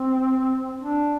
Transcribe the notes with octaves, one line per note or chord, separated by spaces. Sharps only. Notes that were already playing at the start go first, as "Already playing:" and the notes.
Already playing: C4
D4